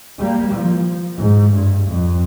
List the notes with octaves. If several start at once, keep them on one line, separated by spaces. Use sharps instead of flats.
G3 A#3
F3
G#2
G2
F2